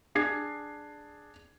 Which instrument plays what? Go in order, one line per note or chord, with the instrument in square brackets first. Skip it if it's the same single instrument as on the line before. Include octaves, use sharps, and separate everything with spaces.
[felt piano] D4 G#4 G#6 C7